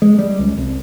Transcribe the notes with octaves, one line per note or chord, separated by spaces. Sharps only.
G#3
G3
C#2
C2